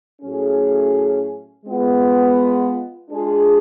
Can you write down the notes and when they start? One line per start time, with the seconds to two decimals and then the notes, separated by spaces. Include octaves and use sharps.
0.22 A2 F#3 A3 C#4 G#4
1.66 G#3 B3 F4
3.11 G#3 D4 F4 G#4